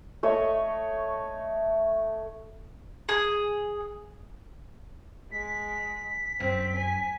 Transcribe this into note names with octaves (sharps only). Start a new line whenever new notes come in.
A3 C#5 D#5
G#4
G#3 B6
F#2 C4
G#5